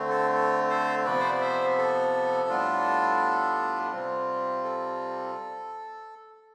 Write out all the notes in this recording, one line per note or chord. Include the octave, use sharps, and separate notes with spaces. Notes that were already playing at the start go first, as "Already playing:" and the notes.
Already playing: D3 A3 C4
A4
A4
A4 C5
C3 F3 B3 B4 D5
C5
D5
C5 E5
A4
A2 G3 B3 D4 F4
C3 G3 C4 F4
A4